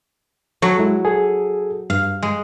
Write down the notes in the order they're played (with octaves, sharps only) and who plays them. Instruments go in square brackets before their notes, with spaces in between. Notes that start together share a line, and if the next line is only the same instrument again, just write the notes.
[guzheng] F#3 F#4 [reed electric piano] A4
[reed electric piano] G#3 E4
G#4 A4
[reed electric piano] G2 [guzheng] F5
[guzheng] G#3